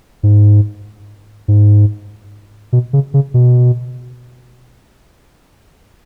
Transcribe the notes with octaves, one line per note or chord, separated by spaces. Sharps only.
G#2
G#2
B2
C#3
C#3
B2